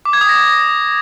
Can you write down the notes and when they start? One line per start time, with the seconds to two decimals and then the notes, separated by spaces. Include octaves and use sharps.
0.05 D6
0.13 G#6
0.21 D#6
0.29 A#6